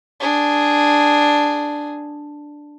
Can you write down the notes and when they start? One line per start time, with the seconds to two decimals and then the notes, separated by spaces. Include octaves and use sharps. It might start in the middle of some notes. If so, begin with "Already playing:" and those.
0.20 D4 G#4